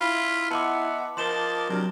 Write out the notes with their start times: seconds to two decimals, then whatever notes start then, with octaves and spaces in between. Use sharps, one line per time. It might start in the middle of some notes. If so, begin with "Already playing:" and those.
0.01 E4 F4 B5
0.51 B3 D#5 E5 F#5 A5 C6 D6
1.17 F3 A#4 D#5 C6 D6 A6 E7 G7
1.69 C3 F#3 D4 A#4 D5